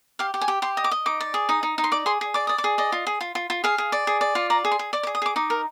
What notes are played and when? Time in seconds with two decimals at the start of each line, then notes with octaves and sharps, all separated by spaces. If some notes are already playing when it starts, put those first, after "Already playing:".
0.19 G4 F5
0.34 G4
0.41 G#5
0.48 G4
0.62 G4 C6
0.77 D#5
0.84 D6
0.91 D#5
1.06 D#4 D6
1.20 D5
1.34 G#4
1.49 D#4 D#6
1.63 D#4
1.78 D#4
1.84 C6
1.92 D5 D6
2.06 G#4 C6
2.21 G#4
2.34 D5 D6
2.47 D5 D#6
2.58 D6
2.64 G#4
2.78 D5 D#5
2.92 F4
3.07 G#4
3.21 F4
3.35 F4
3.50 F4
3.64 G#4 F5
3.78 G#4
3.92 D5
4.07 G#4
4.21 D5
4.35 F4
4.50 D5 A#5
4.65 G#4
4.72 C6
4.79 G#4
4.93 D5 D6
5.03 D6
5.07 G#4
5.15 D#6
5.22 G#4 D6
5.36 D#4 D6
5.50 A#4